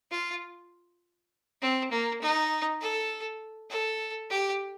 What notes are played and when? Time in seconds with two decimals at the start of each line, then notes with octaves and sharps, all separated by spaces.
0.11 F4
1.61 C4
1.91 A#3
2.21 D#4
2.81 A4
3.70 A4
4.30 G4